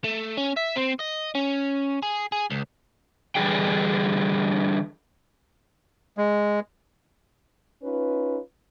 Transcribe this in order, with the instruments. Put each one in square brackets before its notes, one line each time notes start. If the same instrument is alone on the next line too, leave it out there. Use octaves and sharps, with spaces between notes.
[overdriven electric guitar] A3
C#4
E5
C4
D#5
C#4
G#4
G#4
C#2
[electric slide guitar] D3 E3 G3 D4 G#4 G5
[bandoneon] G#3
[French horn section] C#4 D#4 F4 B4